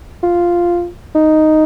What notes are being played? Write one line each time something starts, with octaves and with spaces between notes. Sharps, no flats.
F4
D#4